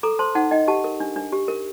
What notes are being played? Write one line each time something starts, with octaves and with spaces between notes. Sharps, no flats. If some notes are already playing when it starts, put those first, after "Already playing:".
A4 A#5 D6
C5 A5 C6
D#4 F#5 A5
D#4 D#5 G5
G4 F#5 A5
A#4
D4
D4
G4
A#4